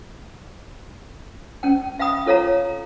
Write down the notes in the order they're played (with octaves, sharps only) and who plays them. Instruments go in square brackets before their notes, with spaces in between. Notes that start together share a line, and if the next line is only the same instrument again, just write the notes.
[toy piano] C#4 G5
E5 F5 G5 B5 D#6
F4 A4 C#5 F5 A#5